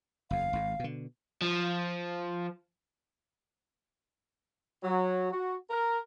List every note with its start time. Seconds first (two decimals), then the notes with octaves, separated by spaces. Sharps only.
0.31 F#1 E2 F5
0.53 G#1 G#2
0.79 B2 D3
1.42 F3
4.82 F#3
5.32 F#4
5.70 A#4